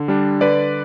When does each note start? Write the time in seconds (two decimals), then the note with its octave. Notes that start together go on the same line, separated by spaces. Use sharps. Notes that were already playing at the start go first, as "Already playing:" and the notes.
Already playing: D3
0.08 G3 D4
0.41 D3 B4 D5